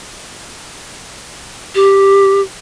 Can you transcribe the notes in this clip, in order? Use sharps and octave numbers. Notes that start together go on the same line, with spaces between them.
G4